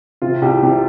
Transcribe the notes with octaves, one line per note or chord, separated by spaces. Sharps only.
C3 F4
C2 G4
C3 G4